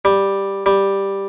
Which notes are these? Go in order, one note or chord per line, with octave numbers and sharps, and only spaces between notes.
G3
G3